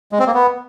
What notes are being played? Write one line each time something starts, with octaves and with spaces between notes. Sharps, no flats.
G#3
C4
A#3
B3